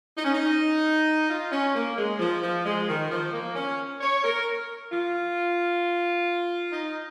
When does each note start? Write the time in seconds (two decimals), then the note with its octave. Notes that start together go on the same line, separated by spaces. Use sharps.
0.17 D#4
0.25 C#4
0.32 D#4
1.30 F4
1.52 C#4
1.75 A#3
1.98 G#3
2.19 F3
2.43 F3
2.65 G#3
2.88 D#3
3.11 F3
3.33 A#3
3.55 C#4
4.01 C#5
4.24 A#4
4.91 F4
6.72 D#4